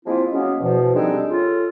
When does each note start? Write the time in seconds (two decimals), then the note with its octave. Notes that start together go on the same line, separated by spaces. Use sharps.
0.05 F3 G#3 A#3 C4 E4 F4
0.32 F#3 G#3 A#3 B3 C#4
0.60 E2 B2 F3
0.95 G3 G#3 C4 D4 D#4 A4
1.29 C#3 F4 A4